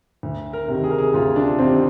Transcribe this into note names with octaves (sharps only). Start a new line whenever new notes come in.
D2
A#4
C3 D#3
G#4
A#4
G#4
D2 F4
D4
C3 D#3 C4